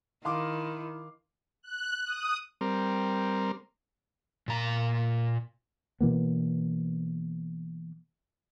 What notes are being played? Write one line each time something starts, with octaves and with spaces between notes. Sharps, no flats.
D#3 E4 F5 C6 D6
F#6
D#6
G3 C4 A#4
A#2 A#5
B2 E3 A#3 B3